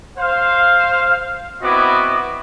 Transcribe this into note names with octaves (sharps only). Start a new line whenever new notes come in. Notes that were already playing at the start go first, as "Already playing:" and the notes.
C5 F5
B3 C4 E4 F#4 D#5 D6